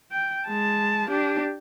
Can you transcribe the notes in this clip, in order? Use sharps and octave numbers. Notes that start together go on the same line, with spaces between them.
G5
G#3 A5
D4 G4